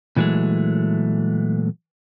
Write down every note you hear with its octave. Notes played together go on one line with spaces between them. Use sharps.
A#2 E3 F#3 G#3 A3